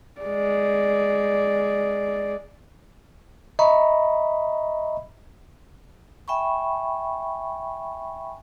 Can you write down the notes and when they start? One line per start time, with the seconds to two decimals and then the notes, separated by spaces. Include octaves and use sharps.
0.21 G#3 D5
3.59 D#5 E5 A#5 B5 C#6
6.28 E5 G5 G#5 B5 C#6